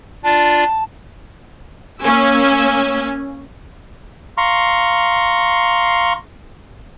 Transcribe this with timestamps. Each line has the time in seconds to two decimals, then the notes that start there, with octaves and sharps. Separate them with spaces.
0.24 D4 F4 D5 A5
2.01 A#3 C#4 G#5 E6
4.38 F5 A#5 C6 C#6